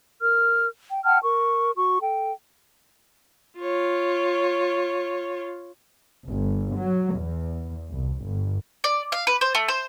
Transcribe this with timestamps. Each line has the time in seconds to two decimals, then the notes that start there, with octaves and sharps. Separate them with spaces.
0.20 A#4 F6
0.90 G5
1.05 F#5 G5 A5 F6
1.24 A#4 C#6
1.77 F#4 C#6
2.00 A4 G5
3.59 F4 C#5
6.27 G1
6.77 F#3
7.17 E2
7.92 C2
8.25 G1
8.84 D5
9.12 F5
9.27 B4
9.41 C5
9.55 A3
9.68 C5